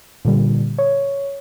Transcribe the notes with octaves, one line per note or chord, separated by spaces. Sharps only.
A#2 D3 G3
C#5